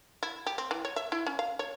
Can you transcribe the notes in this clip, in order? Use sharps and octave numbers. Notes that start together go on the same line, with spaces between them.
E4
G4
C4
E3
C#5
E5
E4
C#4
F5
C#5